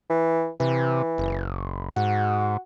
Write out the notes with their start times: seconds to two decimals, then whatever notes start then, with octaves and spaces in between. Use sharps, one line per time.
0.10 E3
0.60 C3 E3
1.18 F#1
1.96 G#2 F#4